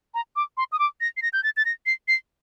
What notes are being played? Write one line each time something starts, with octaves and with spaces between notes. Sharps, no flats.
A#5
D6
C6
D#6
D6
A#6
C7
A#6
G6
A6
A6
A#6
C7
C7